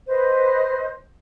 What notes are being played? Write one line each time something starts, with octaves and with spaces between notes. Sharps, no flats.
B4 C5 D#5